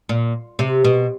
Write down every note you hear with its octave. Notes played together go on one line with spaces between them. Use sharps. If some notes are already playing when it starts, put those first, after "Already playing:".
A#2
C3
B2